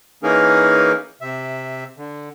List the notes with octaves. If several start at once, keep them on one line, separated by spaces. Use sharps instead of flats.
E3 A#3 C#4 D#4 G#4 A#4
C3 E5
D3